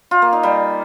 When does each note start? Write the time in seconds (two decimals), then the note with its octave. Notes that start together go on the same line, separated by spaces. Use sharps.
0.11 F4
0.22 A#3
0.33 D#4
0.43 G3